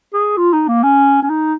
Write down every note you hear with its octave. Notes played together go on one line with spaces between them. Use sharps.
G#4
F4
D#4
A#3
C#4
C#4
D#4